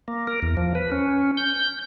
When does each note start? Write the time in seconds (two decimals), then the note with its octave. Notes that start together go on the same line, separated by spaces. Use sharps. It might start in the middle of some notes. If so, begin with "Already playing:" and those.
0.08 A#3
0.27 A#4
0.42 E2
0.57 F3
0.75 B4
0.92 C#4
1.37 G6